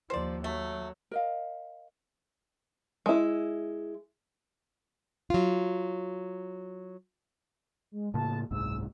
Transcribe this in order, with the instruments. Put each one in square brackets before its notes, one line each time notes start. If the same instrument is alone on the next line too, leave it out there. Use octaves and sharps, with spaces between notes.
[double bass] D#2 F3 [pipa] C5 D5
[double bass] F#3 [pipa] A3
[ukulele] A#4 D#5 F5
[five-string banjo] G#3 E4
[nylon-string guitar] F#3 F4
[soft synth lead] G#3
[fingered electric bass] A2 C#3 A#3 [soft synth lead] A5
[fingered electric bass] F#1 C2 G#2 [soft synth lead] E6